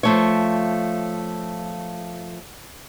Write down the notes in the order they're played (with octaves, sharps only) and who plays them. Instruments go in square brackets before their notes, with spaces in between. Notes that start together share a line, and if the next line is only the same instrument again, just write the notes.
[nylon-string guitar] F3 A3 C#5